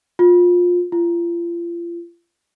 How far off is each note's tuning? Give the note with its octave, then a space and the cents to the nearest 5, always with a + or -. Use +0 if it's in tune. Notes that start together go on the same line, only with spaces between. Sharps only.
F4 +20
F4 -35